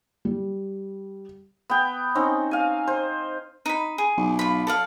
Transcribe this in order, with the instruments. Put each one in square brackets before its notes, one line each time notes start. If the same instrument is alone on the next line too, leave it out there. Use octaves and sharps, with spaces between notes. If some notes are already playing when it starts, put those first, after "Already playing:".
[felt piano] G3
[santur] B3 G5
C4 C#4 D#4
F5 G#5
C5
[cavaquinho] D#4 B5
G#4
[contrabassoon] B1
[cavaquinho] F4 B5
A4 D5 F5